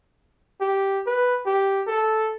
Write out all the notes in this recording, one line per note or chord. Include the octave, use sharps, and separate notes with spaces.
G4
B4
G4
A4